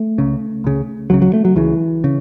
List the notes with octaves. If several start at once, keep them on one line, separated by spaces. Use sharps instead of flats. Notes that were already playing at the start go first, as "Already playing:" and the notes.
Already playing: A3
C#2 C#3
C#2 C#3
C#2 C#3 F#3
F#3
A3
F#3
C#2 C#3 E3
C#3